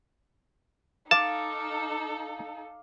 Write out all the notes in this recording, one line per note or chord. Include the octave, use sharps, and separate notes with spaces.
D#4 A4 F5 A5 D6